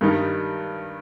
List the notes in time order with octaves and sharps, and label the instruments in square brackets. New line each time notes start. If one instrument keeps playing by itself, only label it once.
[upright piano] G2 D#3 G3 D#4